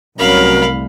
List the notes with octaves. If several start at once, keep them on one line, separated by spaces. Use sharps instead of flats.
C2 A2 F#3 C#4 A#4 F5 B5